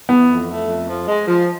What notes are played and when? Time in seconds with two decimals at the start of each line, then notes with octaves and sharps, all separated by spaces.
0.09 E3 B3
0.28 F2
0.48 A3
0.68 F2
0.88 F3
1.08 G#3
1.28 F3